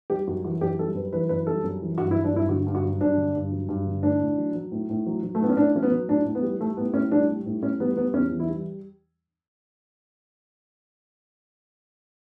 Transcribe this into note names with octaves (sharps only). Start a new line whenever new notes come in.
G3 G4
F#2 F#4
E3 F#4
F#2 G4
G3 A4
F#2 B4
E3 B4
F#2 B4
G3 A4
F#2
E3
G2 F#4
E4
F#3
D4
G2 E4
D3 F#4
G2
F#4
F#3
G2 D4
D3
G2
F#3
G2
D3
A2 D4
A2
F#3
F#3
A2
A2
F#3
F#3
A3
A2 B3
C#4
A2 D4
F#3 C#4
B3
F#3
A2 D4
A2
B3
G3
G3 A3
A2 B3
A2 C#4
G3 D4
G3
A2
A2 C#4
G3 B3
G3 B3
E2 C#4
E3
E4
G3